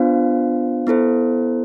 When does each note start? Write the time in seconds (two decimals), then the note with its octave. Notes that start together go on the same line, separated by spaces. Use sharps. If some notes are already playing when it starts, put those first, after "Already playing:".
Already playing: B3 D4 F4 C5 F5
0.87 B3 E4 A4 C5